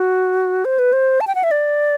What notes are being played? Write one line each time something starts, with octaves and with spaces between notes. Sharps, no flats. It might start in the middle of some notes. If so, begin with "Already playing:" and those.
Already playing: F#4
C5
B4
C5
A5
G5
F#5
E5
D5